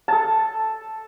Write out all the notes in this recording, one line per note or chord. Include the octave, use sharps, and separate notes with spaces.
A4 A5